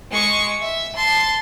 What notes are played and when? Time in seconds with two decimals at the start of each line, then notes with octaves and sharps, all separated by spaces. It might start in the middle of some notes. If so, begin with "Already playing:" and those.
0.11 G#3 C#6
0.62 E5
0.96 A5 C6